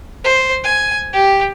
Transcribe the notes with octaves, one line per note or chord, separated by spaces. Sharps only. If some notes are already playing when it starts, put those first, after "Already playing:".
C5
G#5
G4